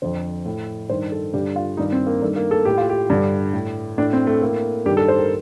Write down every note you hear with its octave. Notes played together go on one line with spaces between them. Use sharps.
F2 D3 C5
A2
G2 D#3 C5
A4
G2 D3 G4
F4
G2 D#3 D#4
C4
A#3
G2 D#3 A3
A#3
A4
A2 G4
F4
G4
G2 D3
A2
A2 D4
C4
A3
A2 A#3
G2 D#3 G4
A4
C5
A#4